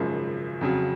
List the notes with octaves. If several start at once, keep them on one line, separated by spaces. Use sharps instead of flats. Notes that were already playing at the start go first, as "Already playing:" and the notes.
Already playing: G#1 F#2 C#3 F3 G#3
F2 C#3 F#3